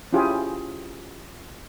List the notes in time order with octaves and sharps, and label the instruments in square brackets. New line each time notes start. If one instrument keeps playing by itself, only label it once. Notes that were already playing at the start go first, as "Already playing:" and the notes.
[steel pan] C#4 E4 F4 G4 G#4